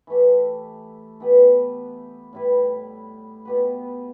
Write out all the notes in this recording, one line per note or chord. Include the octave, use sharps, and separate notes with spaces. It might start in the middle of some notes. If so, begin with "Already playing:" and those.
E3 A3 G4
E3 B3 G4 B4
A2 G3 E4 B4
B2 B3 G4 B4